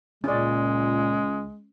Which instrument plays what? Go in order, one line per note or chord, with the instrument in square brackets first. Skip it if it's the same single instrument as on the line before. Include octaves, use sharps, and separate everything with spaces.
[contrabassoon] C#2 [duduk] A#2 [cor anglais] G#3 [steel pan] C#4 D5